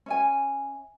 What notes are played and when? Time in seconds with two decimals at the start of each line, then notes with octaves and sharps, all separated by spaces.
0.06 C#4 E5 G#5